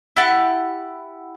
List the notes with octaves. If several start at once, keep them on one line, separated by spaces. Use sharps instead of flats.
E4 G4 F#5 A5